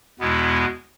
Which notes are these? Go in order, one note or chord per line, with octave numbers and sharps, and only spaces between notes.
E2 B2 G#3 B3 E4